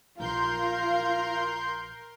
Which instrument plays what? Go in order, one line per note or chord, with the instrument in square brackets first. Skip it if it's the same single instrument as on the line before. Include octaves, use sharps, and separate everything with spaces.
[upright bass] A#1 [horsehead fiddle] F4 F5 [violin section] A#4 [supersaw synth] C6 G6